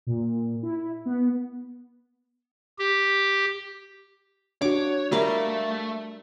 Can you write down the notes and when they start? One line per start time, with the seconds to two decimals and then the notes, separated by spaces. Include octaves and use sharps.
0.07 A#2
0.63 E4
1.06 B3
2.79 G4
4.62 D4 F#4 C#5 D6
5.12 G3 A3 A#4 E5 F5